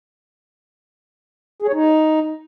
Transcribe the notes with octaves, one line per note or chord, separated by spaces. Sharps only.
G#4
C#5
D#4